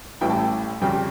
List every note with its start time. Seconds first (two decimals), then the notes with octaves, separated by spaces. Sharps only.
0.21 A1 A2 G3 G5
0.29 A5
0.36 G5
0.81 F2 C#3 G3 G5